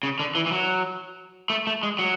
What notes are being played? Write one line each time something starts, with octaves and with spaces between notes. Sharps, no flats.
C#3
D3
E3
E3
F#3
A3
A3
G#3
F#3